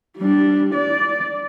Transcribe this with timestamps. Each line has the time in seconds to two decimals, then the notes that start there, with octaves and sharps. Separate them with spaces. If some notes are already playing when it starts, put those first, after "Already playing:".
0.17 G3 D4
0.73 D5